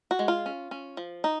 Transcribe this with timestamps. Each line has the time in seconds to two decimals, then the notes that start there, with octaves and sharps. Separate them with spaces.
0.11 F#4
0.19 G#3
0.28 F4
0.46 C#4
0.71 C#4
0.97 F3
1.24 D#4